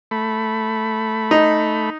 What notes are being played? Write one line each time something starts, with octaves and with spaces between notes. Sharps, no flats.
A3 B5
D#4